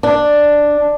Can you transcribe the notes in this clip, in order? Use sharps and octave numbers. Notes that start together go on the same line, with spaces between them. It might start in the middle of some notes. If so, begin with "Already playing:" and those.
D4